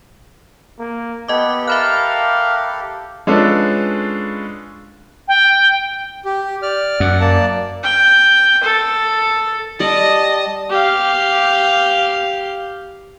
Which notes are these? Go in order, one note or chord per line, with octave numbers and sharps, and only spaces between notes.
A#3
B3 G4 A4 D#5 D6
A#4 E5 F5 B5 F#6
G#3 C#4 D4 F4 A4 B4
G5
G4
D5 F6
F#2 F#5
A#3 D5 A5
G5
A4
G3 D5 D#5 A5 D6
G4 F5